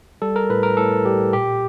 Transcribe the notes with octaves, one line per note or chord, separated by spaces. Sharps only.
G3 A4
A#4
A2 B4
A#4
A2 A4
G3 G4
A#2 G4